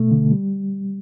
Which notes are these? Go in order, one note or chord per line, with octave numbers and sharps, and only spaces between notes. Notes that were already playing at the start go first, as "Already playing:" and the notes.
Already playing: B2 A3
D3
G3